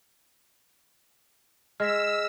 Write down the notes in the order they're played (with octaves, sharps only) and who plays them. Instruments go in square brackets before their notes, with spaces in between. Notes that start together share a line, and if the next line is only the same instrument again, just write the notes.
[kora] G#3 [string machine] E6 [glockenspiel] F6 A#6 B6